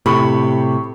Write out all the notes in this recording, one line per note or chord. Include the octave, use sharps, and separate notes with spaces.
A2 C3 G4 B5 C#6